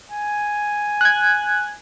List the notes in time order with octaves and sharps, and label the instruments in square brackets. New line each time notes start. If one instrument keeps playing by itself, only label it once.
[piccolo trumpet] G#5
[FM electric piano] F#6 G#6